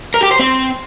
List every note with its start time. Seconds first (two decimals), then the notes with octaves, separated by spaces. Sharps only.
0.14 A#4
0.23 G4
0.31 C5
0.39 C4